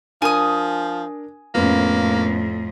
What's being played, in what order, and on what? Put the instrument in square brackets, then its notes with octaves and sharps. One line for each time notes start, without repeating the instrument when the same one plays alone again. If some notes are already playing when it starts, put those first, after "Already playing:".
[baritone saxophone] F3 [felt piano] D4 A#4 [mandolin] G#5 D#6
[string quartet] F2 A2 [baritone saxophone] A#3 [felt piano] B3 C#4